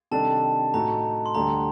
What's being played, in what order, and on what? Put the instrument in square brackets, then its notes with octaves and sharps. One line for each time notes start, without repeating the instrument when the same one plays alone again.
[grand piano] C3 D#3 G3 D4 A4 [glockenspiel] A5
[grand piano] A2 A3 D#4 F#4 [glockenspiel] A#5
[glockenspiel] C6
[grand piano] D2 D3 G3 [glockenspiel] A#5